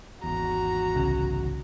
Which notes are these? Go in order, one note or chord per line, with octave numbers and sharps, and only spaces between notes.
G#1 E2 F#4 A#5
C2 C#3